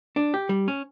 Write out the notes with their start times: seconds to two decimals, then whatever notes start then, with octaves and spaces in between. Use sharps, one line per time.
0.16 D4
0.34 G4
0.49 G3
0.68 C#4